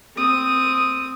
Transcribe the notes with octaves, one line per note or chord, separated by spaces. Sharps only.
C4 D#6